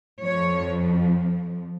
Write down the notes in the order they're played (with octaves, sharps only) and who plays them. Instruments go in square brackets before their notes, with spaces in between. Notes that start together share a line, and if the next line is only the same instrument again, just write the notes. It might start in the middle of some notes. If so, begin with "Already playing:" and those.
[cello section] F2 F3 C#5